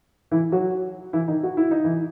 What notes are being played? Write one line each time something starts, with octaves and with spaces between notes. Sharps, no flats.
E3 E4
F#3 F#4
E3 E4
D#3 D#4
F#4
E4
D#4
E3 E4